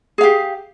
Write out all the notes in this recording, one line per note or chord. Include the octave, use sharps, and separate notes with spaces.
G4 G#4 F5